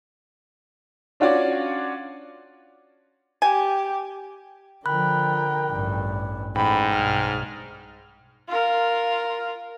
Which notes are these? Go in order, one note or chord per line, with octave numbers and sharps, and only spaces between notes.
C#4 D4 F4 F#4 C#5 D5
G4 G#5
D3 F3 A#4 G5 B5 F#6
A1 G2
A1 G#2 G5 B5
B1 G2 F6
F4 A#4